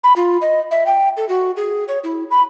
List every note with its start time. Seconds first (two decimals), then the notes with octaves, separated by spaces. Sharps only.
0.04 B5
0.16 F4
0.41 D#5
0.71 E5
0.86 G5
1.17 A4
1.29 F#4
1.57 G#4
1.88 C#5
2.04 E4
2.31 B5